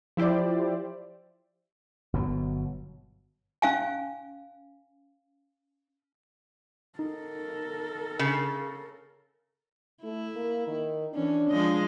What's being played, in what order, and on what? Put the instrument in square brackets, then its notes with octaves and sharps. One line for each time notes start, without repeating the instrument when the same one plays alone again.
[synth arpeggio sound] F3 E4 G4 C5 D5
[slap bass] G1 B2 F#3
[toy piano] C#4 F5 G#5
[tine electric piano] D#4 [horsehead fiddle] A4 A#4
[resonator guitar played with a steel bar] C#3
[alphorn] A3 [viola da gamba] E4
[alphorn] A#3
D#3
[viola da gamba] E3 C#4 [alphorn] D4
[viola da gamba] F3 G#3 D#5